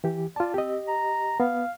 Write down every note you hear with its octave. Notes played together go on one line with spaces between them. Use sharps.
E3 G4
F4 D5 A5
C4 G4 D#5
A#5
B3 F5